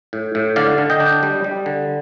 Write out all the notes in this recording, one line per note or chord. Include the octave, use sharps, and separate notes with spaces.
A2
A2
D3 D5 F5
D3
D#5 G5
D4
G3
G3
D3